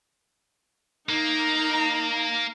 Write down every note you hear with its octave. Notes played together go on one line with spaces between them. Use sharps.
A#3 D#4 A#5